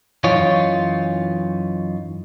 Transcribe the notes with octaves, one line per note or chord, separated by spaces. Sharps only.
F#2 E3 D#4 F4 C#5